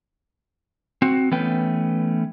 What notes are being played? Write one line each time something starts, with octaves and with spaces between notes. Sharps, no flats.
C4 F#4
E3 A3 B3 C#4 B4 G5